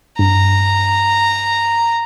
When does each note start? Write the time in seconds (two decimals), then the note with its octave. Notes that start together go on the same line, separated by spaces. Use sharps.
0.19 G2 A#5